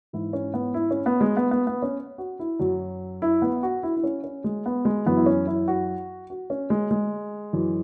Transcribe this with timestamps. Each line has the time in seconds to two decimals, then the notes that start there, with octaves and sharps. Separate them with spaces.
0.13 G#2 E3 E4
0.33 C#4
0.54 B3
0.74 E4
0.91 C#4
1.06 B3
1.21 G#3
1.37 B3
1.51 B3
1.67 B3
1.82 C#4
2.18 F#4
2.39 E4
2.59 F#2 F#3
3.22 E4
3.42 B3
3.63 F#4
3.83 E4
3.97 E4
4.04 C#4
4.24 C#4
4.44 G#3
4.66 B3
4.85 G#3
5.06 F#2 E3 B3
5.17 E4
5.26 C#4
5.47 E4
5.68 F#4
6.30 F#4
6.50 C#4
6.70 G#3
6.91 G#3
7.53 F#2 E3